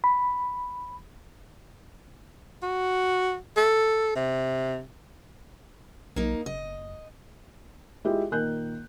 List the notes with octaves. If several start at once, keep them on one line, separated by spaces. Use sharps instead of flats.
B5
F#4
A4
C3
B1 A#3 D#4
F#1 D#5
G#3 E4 F4 G4
A#2 D#3 A#4 F#6 G6